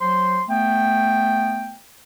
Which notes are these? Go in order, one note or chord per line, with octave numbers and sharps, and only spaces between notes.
F#3 C5 C6
A3 B3 G5